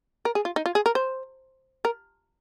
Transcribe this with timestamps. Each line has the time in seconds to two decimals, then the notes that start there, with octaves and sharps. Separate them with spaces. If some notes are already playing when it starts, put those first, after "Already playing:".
0.25 A#4
0.35 G#4
0.45 F4
0.56 D#4
0.66 F4
0.75 G#4
0.86 A#4
0.95 C5
1.85 A#4